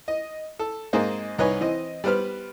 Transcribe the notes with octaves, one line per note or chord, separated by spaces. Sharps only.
D#5
A4
G#2 A#3 C4 G#4 C5 D#5
C2 D#4 B4 C#5 G#5
E3 C4 D#5
G3 B3 B4 C5 F6